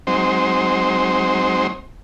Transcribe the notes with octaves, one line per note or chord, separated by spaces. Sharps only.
F#3 G#3 C4 D#4 C5